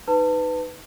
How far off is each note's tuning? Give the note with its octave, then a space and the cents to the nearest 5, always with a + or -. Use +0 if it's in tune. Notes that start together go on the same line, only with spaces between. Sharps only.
D#4 +0 B4 +15 A5 +25